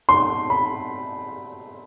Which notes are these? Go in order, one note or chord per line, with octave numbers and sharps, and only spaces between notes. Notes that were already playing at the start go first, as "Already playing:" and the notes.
C6
B5